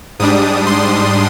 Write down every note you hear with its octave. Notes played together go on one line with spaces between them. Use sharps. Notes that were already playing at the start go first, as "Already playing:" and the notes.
G#2 G3 D4 D#6
C6